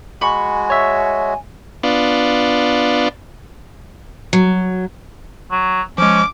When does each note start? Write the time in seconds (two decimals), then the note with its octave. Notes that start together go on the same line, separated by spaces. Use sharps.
0.21 G#3 F#4 G#5 B5 C#6
0.70 C#5 E5
1.83 B3 D4 F4
4.33 F#3
5.51 F#3
5.98 F3 G#3 C#4 D6